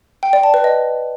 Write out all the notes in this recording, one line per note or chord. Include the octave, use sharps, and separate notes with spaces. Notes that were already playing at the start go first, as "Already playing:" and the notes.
G5
D5
A5
B4
D#5